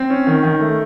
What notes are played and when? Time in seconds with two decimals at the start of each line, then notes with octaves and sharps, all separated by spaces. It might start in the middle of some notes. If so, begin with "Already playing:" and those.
Already playing: C4
0.10 C#4
0.27 D#3
0.43 D#3
0.61 A3